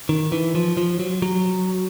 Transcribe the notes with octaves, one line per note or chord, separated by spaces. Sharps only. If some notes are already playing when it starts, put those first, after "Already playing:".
D#3
E3
F3
F3
F#3
F#3